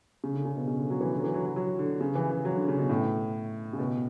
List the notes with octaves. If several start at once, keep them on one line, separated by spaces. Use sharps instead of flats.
C#3
D3
C#3
B2
C#3
D3
F#3
E3
D3
F#3
E3
F#3
F#3
F#3
D3
C#3
E3
E3
F#3
D3
C#3
B2
A2
C#3
B2